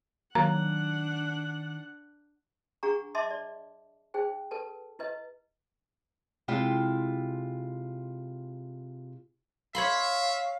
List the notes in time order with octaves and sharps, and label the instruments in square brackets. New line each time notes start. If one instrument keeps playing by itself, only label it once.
[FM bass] D#3 [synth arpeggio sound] F#3 A#3 [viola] D4 F#5 [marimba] A#5
[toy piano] D4 G#4 F#5 A#5 C#6
D#5 E5 A5 C6 D6
D5
D#4 G#4 C5 G5
A4 B4 A5
E4 B4 D#5
[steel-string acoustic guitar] C3 G#3 E4 F4 G5
[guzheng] C#5 B5 C6 [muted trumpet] E5 [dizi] F5